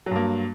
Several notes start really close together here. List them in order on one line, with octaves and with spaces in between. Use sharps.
F#3 G2 A#3